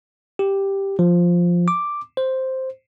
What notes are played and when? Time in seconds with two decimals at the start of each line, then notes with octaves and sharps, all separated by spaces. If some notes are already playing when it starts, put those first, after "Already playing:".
0.39 G4
0.99 F3
1.68 D6
2.17 C5